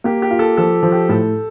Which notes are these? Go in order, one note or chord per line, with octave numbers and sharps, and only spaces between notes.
A#3 G4
G4
F4
A4
F3 A4
F3
G4
A2 A4